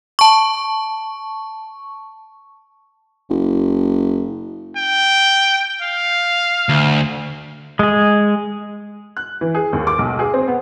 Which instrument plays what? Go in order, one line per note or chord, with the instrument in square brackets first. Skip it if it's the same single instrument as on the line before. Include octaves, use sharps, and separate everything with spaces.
[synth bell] A5 C#6
[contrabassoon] F#1
[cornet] G5
F5
[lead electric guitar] D2
[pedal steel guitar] G#3 G#4
[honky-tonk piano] F#6
E3
G#4
D#2
D6
B1
G#4
C4
B3